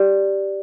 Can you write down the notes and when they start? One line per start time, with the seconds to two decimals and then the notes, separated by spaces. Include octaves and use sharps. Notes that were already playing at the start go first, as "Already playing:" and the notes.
Already playing: G4 D5